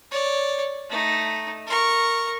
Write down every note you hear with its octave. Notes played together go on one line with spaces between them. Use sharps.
C#5 D5
A3 D#4
A#4 C#6